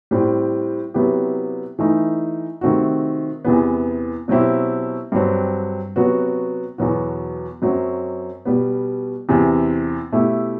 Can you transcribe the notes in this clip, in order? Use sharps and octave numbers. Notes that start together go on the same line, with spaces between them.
A2 G3 C4
C3 F#3 B3 E4 G4
E3 A3 D#4
C3 D#3 A3 C4 F#4
E2 C3 E3 B3
B2 F#3 C4 E4 G4
G2 F#3 C4
C3 F#3 B3 F#4
E2 B2 F#3 B3 F#4
F#2 F#3 C4 F#4
B2 G3 B3
E2 C3 E3
B2 A3 E4 G4